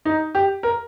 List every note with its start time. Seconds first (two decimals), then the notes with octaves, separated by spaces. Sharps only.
0.05 D#4
0.35 G4
0.63 A#4